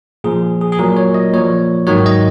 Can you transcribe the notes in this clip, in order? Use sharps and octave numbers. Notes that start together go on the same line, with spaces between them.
A#2 F3 G#4
G#4
G#4
A#2 F#3 A#4
C#5
D#5
A#2 F3 C#5
G#2 D#3 F#3 C#5
D#5